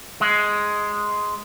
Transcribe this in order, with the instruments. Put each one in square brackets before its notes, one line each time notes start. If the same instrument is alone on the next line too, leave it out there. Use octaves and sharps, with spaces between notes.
[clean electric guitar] G#3